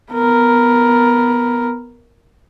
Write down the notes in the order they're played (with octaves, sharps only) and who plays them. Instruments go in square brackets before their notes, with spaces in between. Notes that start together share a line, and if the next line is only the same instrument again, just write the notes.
[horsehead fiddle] B3 A#4